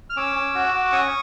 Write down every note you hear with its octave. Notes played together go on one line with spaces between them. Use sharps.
F6
C#4 D6 E6
C#4
F#4
F#4
C#4 C#6 D#6